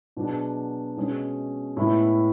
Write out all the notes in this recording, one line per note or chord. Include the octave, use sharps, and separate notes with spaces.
B2 F#3 B3 D4 G#4
B2 G#3 C#4 G#4
A2 G#3 B3 E4